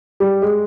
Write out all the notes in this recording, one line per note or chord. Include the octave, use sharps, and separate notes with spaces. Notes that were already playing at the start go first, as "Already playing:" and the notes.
G3
G#3